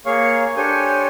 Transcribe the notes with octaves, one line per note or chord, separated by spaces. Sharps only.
A#3 G#4 C#5 F5 C#6
D4 G4 A4 C5 C#5 G#5